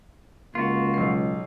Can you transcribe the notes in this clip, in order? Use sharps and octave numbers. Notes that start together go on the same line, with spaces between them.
C#2 A#3 F4 F#4
B1 C7